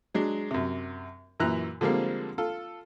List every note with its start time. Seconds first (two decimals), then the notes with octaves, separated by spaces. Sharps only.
0.15 F#3 G#3 D4
0.51 F#2 C3
1.40 F#2 A#2 E3 A#5 F#6
1.81 D3 F3 G3 G#3 A#3 C4
2.38 F4 A4